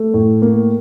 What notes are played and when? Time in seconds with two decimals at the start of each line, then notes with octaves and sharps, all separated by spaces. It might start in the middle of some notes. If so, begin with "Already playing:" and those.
Already playing: A3
0.14 A2
0.42 A#3